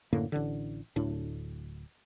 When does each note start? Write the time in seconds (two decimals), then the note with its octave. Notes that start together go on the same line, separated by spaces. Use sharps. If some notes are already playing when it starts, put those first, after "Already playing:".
0.13 F#2 A2 D3 A#3
0.32 A1 D3
0.96 D1 D2 A2 D4